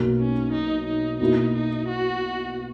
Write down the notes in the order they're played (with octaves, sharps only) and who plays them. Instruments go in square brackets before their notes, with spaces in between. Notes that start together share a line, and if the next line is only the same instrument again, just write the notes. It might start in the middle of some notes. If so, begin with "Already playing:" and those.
Already playing: [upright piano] B1 B2 F#3 A#3
[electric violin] C#4
D#4
D#4
[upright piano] B2 A#3 E4 [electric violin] D#4
[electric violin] D#4
F#4